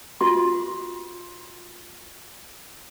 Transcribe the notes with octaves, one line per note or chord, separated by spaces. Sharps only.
F4 F#4 C6